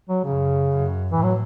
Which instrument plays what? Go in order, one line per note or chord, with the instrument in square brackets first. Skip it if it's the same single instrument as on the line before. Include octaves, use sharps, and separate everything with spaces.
[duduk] F#3
[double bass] F#2 [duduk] C#3
[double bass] F#2
[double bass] A2 [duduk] E3
[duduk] F#3